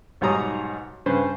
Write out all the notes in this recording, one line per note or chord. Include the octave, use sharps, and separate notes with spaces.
B1 G#2 G3 C#5 A#5 D#6
G2 C#3 B4 C5